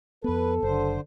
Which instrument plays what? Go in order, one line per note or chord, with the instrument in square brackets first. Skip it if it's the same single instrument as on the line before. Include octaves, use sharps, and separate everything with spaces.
[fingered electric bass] F2 B3 [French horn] A4 [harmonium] B4
[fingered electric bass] F#1 [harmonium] D3 C5